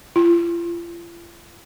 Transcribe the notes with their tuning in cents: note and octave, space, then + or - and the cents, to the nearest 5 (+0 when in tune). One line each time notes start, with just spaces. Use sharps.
F4 -40